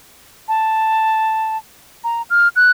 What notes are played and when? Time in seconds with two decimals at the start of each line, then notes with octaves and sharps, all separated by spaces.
0.48 A5
2.04 A#5
2.30 F6
2.56 F#6